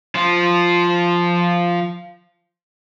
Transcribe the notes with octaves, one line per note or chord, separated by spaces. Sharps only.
F3 F4